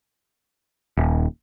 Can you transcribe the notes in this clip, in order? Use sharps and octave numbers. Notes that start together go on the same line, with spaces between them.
D#1